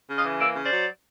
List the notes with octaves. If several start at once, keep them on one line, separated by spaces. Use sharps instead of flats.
C#3
D#5 F5
E3
A#3 D5 E5
C#3
C5 D5
F#3